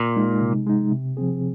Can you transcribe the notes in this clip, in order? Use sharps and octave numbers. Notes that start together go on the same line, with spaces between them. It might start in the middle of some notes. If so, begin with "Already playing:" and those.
Already playing: A#2
G#3 D#4
C3
G#3 D#4
C3
F3 C4 G#4